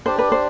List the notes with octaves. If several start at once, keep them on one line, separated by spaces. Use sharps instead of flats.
D4 G4 C5 D5
B4
C5